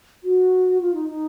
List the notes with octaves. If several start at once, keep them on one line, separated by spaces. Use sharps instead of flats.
F#4
F4
D#4
D#4